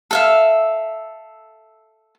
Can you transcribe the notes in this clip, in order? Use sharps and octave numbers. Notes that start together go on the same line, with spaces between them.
A4 E5 F5